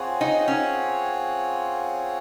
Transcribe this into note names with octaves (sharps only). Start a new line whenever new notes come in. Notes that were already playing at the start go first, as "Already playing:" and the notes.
Already playing: C4 F4 G#4 C#5 F#5
D#4
C#4